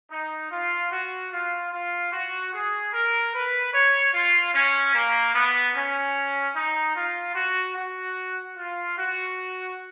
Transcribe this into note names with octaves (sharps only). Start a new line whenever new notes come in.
D#4
F4
F#4
F4
F4
F#4
G#4
A#4
B4
C#5
F4
C#4
A#3
B3
C#4
D#4
F4
F#4
F#4
F4
F#4